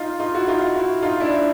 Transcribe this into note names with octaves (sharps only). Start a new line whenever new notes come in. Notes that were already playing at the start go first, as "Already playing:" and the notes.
Already playing: D#4 F4
D#4 F4
E4 F#4
D#4 F4
E4 F#4
D#4 F4
D4 E4